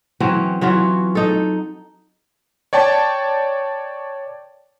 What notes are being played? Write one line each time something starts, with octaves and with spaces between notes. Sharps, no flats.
E3 F#3 C4 C#4
E3 F#3 F4 F#4
D#4 A4
C#5 D5 G5 A5